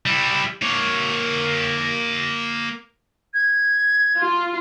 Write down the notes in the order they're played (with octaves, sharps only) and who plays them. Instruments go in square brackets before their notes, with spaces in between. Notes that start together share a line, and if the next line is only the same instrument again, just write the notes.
[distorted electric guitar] G3 E4
A#3 C#5
[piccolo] G#6
[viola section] F4